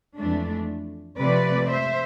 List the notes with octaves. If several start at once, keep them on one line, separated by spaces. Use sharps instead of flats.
F2 E3 A3 D4
C3 F3 A3 B4 D5
C5 E5